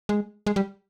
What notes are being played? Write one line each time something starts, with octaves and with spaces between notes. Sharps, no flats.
G#3
G#3
G3